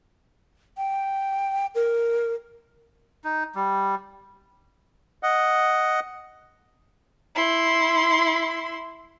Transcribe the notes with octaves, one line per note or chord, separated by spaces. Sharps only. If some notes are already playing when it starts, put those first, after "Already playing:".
G5
A#4
D#4
G3
D#5 F#5
E4 C6